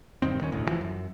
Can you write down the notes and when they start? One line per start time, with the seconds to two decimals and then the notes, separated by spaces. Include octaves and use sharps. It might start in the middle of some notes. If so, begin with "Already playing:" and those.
0.22 E1 G2 D#3 C4
0.40 D#1 D#3 B3 C#4
0.52 E1 A1 D2 A2
0.67 E3 F3
0.81 F#2